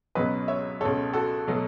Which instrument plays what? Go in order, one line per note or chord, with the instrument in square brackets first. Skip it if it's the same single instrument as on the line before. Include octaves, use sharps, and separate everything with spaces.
[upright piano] C#2 B2 F#3 B3 B4 D#5
C#5 E5
C#2 B2 A3 A4 C#5
F#4 A4
B2 F#3 A3